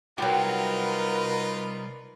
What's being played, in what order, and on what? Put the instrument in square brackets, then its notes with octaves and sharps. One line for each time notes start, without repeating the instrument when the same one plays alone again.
[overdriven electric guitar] C2 [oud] F#3 G4 [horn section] D#4 F4 [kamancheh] A#4 B4